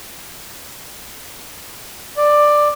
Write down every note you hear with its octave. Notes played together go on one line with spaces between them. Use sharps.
D5